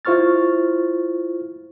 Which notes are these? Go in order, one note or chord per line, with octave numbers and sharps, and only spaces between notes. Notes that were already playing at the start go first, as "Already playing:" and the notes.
E4 F4 C5 C#6 F6 A6